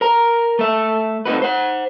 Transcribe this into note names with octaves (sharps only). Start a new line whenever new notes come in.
A#4 A#5
A3 E5
A3 C4 D#4 F#4 B4
C5 F#5